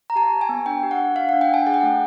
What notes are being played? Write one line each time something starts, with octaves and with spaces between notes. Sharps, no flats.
A#5
G4 A5
G4
G#5
B3
D4 G5
G4
F#5
D4
D4 F5
D4 F#5
G5
D4 G#5
G#4 F#5
G5
A3 F#5